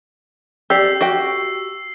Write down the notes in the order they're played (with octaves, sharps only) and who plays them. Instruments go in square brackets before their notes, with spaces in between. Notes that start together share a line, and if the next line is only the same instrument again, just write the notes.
[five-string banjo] G4 D5 [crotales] E6 C7
[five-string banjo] F#4 G4 G5